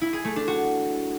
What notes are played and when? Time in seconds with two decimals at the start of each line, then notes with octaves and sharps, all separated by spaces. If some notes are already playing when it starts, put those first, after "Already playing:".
0.01 E4
0.13 G#4
0.25 A3
0.36 D4
0.48 F#4